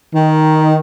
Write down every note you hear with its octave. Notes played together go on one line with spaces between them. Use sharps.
D#3